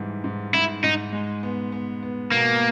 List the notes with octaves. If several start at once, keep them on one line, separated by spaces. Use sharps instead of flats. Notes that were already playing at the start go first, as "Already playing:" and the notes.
Already playing: G#2 E3 G3
G#2
G#2 E4
G#2 D#4
G#3
B3
B3
B3
B2 A#3